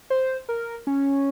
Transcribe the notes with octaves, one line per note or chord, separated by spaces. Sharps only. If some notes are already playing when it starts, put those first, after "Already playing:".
C5
A#4
C#4